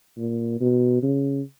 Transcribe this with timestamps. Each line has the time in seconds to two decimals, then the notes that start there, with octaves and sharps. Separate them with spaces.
0.18 A#2
0.61 B2
1.03 C#3